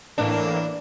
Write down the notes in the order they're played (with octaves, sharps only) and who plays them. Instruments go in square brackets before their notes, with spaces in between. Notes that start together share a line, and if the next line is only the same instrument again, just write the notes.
[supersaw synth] A2 E3 A#3 [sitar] D4